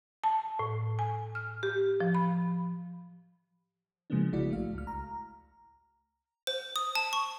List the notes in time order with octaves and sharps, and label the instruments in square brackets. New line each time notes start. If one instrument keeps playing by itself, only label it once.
[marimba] A5
A2
G#5
F6
G4
F3
B5
[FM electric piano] C#3 F3 G#3 A#3 B3 D4
B1 G#3 E4 F#4 D5
A1 A3 F#4 F5
C#2 F6
A#5
[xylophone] C5
D#6
A5
C#6